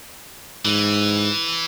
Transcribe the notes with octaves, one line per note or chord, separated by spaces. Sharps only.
G#2 E3